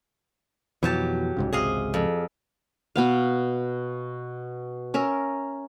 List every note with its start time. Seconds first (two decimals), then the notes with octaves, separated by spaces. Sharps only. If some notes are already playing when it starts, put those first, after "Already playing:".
0.83 F2 B2 E3 F#3 G4 A5
1.37 C2 G#2 C#3
1.53 G#1 C#2 C3 G#4 D#5 F5
1.94 F2
2.96 B2 B3 F5
4.94 C#4 A#4 E5